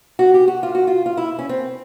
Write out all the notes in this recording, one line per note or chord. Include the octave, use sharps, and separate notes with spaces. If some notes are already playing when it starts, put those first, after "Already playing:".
F#4
G4
F#4
F4
F#4
F4
F4
E4
C#4
C4